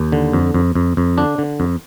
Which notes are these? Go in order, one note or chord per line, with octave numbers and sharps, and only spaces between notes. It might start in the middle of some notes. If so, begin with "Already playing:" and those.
Already playing: D#2
D3
F2
F2
F2
F2
D3 D4
D3
F2